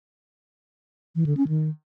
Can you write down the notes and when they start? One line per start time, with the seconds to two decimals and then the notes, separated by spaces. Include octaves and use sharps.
1.15 E3
1.26 D3
1.37 C#4
1.48 D#3